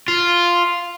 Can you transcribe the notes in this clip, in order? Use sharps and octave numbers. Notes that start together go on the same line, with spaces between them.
F4